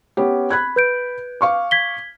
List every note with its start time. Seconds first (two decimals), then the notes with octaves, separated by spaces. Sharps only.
0.17 B3 C#4 G4
0.51 B5 F#6 G#6
0.76 B4 G6 D7
1.41 F5 C#6 D6
1.71 G#6 B6 G7